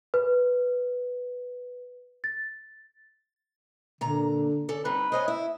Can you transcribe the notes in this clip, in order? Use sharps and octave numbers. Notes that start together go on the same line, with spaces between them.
B4
A6
A#2 D3 A#5
C#4 A4 D5
G3 C4 D#4 B4
C5 C#5 D#5 G#5
E4 E5